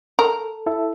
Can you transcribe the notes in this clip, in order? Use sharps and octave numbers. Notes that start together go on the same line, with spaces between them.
A4 A#4
E4 A4 E5